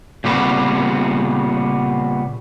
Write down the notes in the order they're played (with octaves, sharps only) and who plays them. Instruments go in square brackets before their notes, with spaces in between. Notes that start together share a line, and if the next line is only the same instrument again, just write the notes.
[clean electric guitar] A#2 C#3 G3 B3 C4